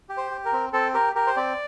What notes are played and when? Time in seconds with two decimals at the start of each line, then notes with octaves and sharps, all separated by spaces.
0.09 G4
0.17 C5
0.31 G4
0.45 A#4
0.53 C4
0.73 C4 A4
0.94 G4 A#4
1.15 G4 A#4
1.27 C5
1.36 C4 D5